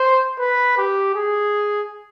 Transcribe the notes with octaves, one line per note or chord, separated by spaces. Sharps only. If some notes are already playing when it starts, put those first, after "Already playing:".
Already playing: C5
B4
G4
G#4